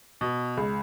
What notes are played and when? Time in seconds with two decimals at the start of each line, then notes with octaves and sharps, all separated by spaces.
0.21 B2
0.57 C#2